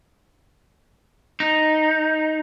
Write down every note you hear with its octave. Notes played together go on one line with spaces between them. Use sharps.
D#4